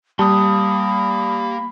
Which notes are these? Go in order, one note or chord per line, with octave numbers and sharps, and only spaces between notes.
G3 A#3 A5 B5 C6 D#6